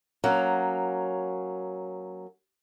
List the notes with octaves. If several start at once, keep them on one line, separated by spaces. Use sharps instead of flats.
F#3 A#3 C#4